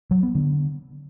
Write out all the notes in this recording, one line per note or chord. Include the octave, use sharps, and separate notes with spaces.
F#3
B3
D3